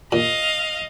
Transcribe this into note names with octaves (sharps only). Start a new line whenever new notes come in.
A#2 D#5 F5